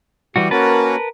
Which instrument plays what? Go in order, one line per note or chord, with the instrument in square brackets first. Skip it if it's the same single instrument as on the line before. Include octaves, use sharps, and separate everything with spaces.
[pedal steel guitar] E3 G3 F#4 [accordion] G4
[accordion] A#3 C#4 F#4 [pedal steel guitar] A#4 B4 A5